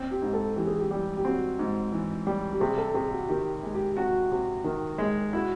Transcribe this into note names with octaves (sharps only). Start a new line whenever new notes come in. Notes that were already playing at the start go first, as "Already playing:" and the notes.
Already playing: C4
G4
G#2
A4
E3 G4
G#4
G4
G3
G4
C4 F#4
G#2
E3
G3
G4
C3 G#4
A4
C3 G#4
F#4
D#3 G4
G#3
G4
C3 F#4
C3
D#3
G#3
E4 F#4